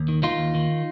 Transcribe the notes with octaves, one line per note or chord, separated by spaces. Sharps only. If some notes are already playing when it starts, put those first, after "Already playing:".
Already playing: D#2
D#3
D#3 D#4 F4
D#2
D#3